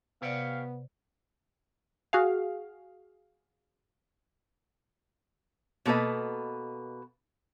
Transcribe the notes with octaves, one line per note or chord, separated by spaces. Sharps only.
C3 B3 G4 C#5 D5 F5 G5
F#4 G#4 F5
B2 A#3 A4 B4 D#5